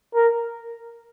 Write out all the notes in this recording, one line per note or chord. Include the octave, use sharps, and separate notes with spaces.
A#4